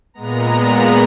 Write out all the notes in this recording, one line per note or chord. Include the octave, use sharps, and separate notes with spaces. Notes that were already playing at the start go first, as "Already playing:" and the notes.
A#2 G#3 B3 A#5
B5